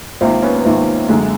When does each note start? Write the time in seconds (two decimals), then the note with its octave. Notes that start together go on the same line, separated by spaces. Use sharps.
0.21 C#2 C3 D#3 A#3 C4
0.42 B3 C#4
0.57 B3
0.65 C#2 C3 D#3 A#3 C4
1.09 F#2 D3 G#3 A#3